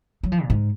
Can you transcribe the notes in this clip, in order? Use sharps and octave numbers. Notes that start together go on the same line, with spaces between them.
F#3
F3
A#2
G#2